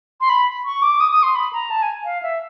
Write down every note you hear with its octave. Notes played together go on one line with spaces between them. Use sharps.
C6
B5
C#6
D6
D#6
D#6
C6
B5
A#5
A5
G#5
F5
E5